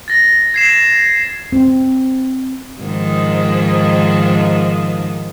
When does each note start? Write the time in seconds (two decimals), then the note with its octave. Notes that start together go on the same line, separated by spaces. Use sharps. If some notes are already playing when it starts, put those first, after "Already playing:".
0.08 A6 A#6
0.54 G#6 C7 E7
1.52 C4
2.81 G#2 D#3 F3